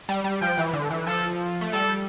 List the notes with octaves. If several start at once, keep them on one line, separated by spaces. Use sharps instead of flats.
G3
G3
F3 G5
E3
D3
E3
F3 A4
A3
G3 A4